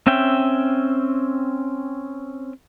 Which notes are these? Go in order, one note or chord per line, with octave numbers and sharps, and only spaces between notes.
C4 C#4 E5 G5